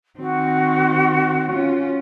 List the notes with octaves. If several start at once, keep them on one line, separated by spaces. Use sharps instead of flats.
D#3 C4 F#4
C#4 F4